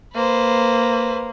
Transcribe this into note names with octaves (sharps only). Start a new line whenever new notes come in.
A#3 B4 C5